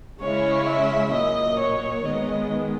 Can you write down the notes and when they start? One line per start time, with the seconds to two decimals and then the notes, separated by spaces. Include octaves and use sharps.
0.21 C#3 G#3 C#4 E4 C#5
0.67 E5
1.13 A#2 F#3 A#3 D#5
1.59 C#5
2.05 D#3 G#3 B3 D#5